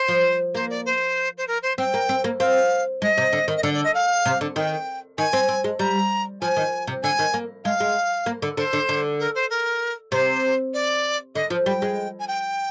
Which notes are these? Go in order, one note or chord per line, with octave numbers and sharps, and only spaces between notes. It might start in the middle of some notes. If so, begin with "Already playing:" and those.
Already playing: C5
F3
A#3 C5
D5
C5
C5
A#4
C5
C4 G5
A#3
C4
A#3
C4 F5
G#3 D#5
C3
D3
D#3
D#5
D3 D5
D5
D#5
F5
C3
D3
D#3 G5
D#3 G#5
C4
C4
G#3
G3 A#5
F3 G#5
D#3
C3
D3 G#5
D#3
A#3
G#3 F5
G#3
A#3
D3
D3 C5
D3
D3
A#4
C5
A#4
C3 C5
D5
D3 D#5
F3
G3 G5
G#3
G#5
G5